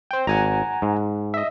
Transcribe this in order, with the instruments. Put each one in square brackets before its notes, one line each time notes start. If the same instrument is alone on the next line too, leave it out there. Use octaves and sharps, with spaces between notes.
[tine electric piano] C5 G5
[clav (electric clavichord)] G#1 [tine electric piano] F#5 G#5 A#5
[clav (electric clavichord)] G#2
[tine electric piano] D#5 E5